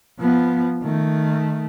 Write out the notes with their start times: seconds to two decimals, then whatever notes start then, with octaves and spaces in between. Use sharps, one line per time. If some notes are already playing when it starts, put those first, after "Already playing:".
0.20 F3 B3
0.83 D#3 A3